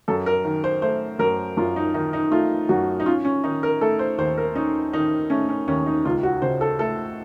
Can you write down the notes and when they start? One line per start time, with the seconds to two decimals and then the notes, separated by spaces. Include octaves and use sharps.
0.08 F#2 A4
0.26 A#4
0.45 D#3
0.64 C5
0.82 A3 C5
1.19 F#2 A#4
1.57 F#2 F4
1.76 D#4
1.94 D#3 D#4
2.13 D#4
2.31 A3 F4
2.69 F#2 F#4
3.00 D#4
3.06 C#4 F4
3.25 C#4
3.44 D#3 D#4
3.63 A#4
3.81 A3 A4
3.99 C5
4.18 D#2 C5
4.38 A#4
4.55 C#4 D#4
4.93 D#3 D#4
5.30 A3 C#4
5.49 C#4
5.68 D#2 C#4
5.86 D#4
6.05 C#2 F4
6.23 F#4
6.42 C#3 C5
6.61 A4
6.79 A3 A4